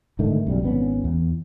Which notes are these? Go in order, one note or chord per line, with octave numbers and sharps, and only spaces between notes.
G#2 D3 D#3 A3
B1 F#2 G3
G#1 B3 C#4
E2